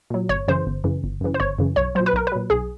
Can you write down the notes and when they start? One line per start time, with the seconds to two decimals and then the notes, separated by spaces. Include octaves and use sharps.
0.10 A#2 F#3
0.29 G1 C#5
0.48 F#2 C#3 E3 C5
0.66 G1
0.84 F#2 C#3 E3
1.04 G1
1.21 F#2 C#3 E3
1.34 C5
1.40 G1 C#5
1.58 F#2 C#3 E3
1.76 B1 C#5
1.95 A#2 F#3 C5
2.06 B4
2.13 B1 A#4
2.27 B4
2.32 A#2 F#3
2.50 B1 G#4